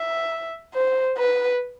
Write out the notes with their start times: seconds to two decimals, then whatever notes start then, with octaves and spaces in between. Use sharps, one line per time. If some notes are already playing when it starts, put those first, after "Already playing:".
Already playing: E5
0.74 C5
1.18 B4